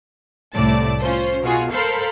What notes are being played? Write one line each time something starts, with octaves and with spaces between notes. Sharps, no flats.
C2 A2 A3 D5 A5
C#4 F4 C5
B2 F4 F#4 G#4
A4 A#4 C5 F5 B5